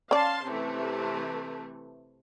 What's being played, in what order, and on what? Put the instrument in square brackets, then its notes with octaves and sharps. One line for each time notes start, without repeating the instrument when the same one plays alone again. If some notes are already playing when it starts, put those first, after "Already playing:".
[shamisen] C#4 D5 [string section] F5 A5 C6
[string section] C3 E3 A3